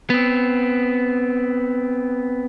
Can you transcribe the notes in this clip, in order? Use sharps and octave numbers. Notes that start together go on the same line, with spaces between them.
B3 C4